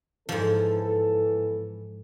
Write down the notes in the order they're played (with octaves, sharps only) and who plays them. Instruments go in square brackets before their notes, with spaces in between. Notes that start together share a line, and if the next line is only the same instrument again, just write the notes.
[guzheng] G#2 F3 [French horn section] E3 B3 A4